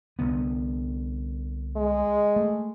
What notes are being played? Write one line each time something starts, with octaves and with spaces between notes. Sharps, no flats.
C2 D3 B3
G#3
A3